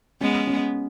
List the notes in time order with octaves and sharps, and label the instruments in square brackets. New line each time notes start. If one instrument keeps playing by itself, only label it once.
[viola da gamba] G#3 B3 [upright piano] C#4
[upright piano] C#4